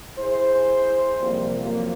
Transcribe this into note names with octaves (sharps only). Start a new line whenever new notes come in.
E4 G#4 C5
F2 C3 E3 G3 A#3
F2 F#3 A#3